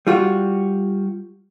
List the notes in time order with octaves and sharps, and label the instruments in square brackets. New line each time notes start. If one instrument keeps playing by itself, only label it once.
[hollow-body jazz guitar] G3 F4 F#4